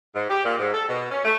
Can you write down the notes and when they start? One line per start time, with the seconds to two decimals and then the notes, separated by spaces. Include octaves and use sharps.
0.14 G#2
0.29 G4
0.44 A#2
0.59 G#2
0.73 A4
0.88 B2
1.11 C#4
1.24 A3